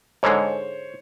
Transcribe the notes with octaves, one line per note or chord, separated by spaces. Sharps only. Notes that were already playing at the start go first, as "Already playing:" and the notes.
G#2 D3 G#3 C5 C#5